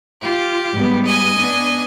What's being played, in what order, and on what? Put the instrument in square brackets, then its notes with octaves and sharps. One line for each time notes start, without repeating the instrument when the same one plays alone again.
[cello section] F4 [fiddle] G4
[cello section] G#2 G3 B3
[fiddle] D#5 G#5
[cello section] B3 D4